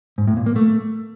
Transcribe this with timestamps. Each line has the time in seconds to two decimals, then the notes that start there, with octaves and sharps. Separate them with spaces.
0.18 G#2
0.27 A2
0.37 A#2
0.46 A#3
0.56 A3